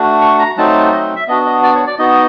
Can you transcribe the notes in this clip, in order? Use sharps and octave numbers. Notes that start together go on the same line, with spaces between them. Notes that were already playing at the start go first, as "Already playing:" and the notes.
Already playing: A3 D4 F#4
C#6
A#5
F#3 A3 C4 D#4 A5
D#5
E5
B3 D4 F#4 D#5
D#5
D5
C#5
D5
B3 D#4 F#4 D#5